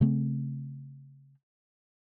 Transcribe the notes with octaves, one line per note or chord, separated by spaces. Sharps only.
C#3 A3 C4